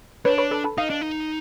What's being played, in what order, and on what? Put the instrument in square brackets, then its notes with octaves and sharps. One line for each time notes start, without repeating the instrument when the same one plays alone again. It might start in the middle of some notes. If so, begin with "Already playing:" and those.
[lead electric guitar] D4 [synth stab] B4 C#5
[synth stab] B4 C#5
A4 B4
A4 B4
[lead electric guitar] D#4 [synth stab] D#5 F5
[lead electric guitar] D4
D#4